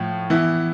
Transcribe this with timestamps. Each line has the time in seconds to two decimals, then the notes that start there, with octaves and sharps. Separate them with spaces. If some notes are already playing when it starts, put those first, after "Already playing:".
Already playing: A2 F3
0.30 E3 B3 E4